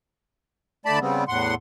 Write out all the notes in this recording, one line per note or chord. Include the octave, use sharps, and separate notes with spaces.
D2 A3 D5 A5 B5
C#3 G3 B3 C4
E2 A2 F#5 C6